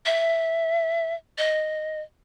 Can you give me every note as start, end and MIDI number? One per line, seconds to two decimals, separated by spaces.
0.06 1.14 76
1.38 2.01 75